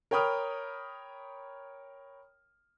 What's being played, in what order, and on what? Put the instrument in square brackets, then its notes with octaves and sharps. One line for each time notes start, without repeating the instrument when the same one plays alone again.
[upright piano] A#4 C#5 G5 B5 D#6 F6